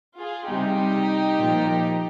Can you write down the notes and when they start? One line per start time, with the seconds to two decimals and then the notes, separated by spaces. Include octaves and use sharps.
0.18 F4 G#4
0.48 C3 G3 D#4 G4
1.38 A#2 F3